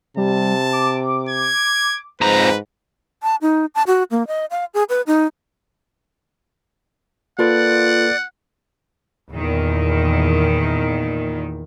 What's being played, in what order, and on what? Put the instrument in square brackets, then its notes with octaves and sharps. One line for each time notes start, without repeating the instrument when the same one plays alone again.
[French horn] C3 [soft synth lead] G3 [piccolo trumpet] A5
[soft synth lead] D6
[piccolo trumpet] G#6
[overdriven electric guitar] F2 A#5 [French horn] G#2 [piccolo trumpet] B4 [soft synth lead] C5
[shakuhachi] A5
D#4
A5
F#4
A#3
D#5
F5
G#4
B4
D#4
[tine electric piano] A#3 A4 B4 [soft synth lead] F4 [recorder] D5 [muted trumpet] F#5
[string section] E2 A#2 D#3